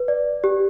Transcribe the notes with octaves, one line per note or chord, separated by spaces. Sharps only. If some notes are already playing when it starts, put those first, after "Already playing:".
Already playing: B4
D5
G4